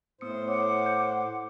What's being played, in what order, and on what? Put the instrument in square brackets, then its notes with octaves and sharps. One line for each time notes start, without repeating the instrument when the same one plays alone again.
[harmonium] A2 C5 [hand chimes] B3 D#6 C#7
[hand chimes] C#5 [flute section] F#5 D6
[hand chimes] G6